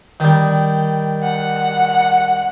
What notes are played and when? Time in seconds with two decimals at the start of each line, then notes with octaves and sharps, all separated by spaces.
0.20 D#3 G3
1.23 F#5